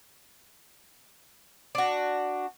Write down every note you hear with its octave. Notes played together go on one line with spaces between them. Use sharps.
D4 F#4